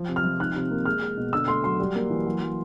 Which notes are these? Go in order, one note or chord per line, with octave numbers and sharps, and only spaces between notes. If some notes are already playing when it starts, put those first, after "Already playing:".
Already playing: F3
C3
F6
F3
D#3 F#6
C3
A#3
G#3 F6
G#3
B2
D3 E6
A3 C6
F#3 C6
G3
A#3
E3
F#3
F#3